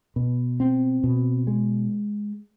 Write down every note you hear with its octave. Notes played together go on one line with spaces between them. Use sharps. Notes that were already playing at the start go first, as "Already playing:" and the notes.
B2
C4
B2
G#3